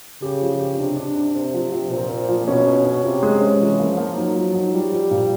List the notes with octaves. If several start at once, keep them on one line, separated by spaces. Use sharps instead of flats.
C#3 G4
F3
G4
C3 D4
D4
D4
C3 C4
F3
F3
A#2 C4
C4
F3
B2 C#4
C#4
C#4
C3 F4
G#3
C#4
E3 F3
A#3
F3
A#3
F#3 D#4
F3
D#4
F3 G3
F3
A#2